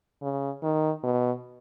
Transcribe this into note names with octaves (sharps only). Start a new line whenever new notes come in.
C#3
D#3
B2